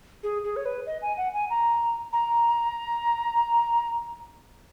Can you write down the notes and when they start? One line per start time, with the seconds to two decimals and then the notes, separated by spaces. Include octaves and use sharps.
0.23 G#4
0.44 G#4
0.56 C#5
0.66 B4
0.87 D#5
1.02 G#5
1.17 F#5
1.34 G#5
1.50 A#5
2.13 A#5